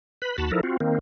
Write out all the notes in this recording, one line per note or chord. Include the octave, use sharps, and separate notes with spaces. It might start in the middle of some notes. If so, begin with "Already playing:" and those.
B4 B5
D#2 F#4 A5 B5
F3 D#4 E4 A4 A#4
C4 F4 F#4
D#3 A#3 C4